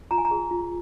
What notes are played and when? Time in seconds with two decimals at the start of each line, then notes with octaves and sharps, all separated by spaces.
0.11 F4 A#5
0.18 G#5
0.25 A#5
0.31 G#4
0.51 F4